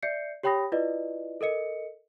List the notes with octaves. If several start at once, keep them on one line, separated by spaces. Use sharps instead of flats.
D5 E5 G6 C7 C#7
G4 C#5 G5 B5 D#6 A#6
E4 F4 B4 D5 D#5
A4 A#4 D#5 C#7